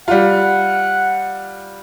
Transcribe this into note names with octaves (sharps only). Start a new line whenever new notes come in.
G3 F4 F#5